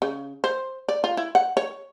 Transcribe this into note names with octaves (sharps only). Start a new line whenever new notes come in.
C#3
C5
D5
F4
E4
F#5
C#5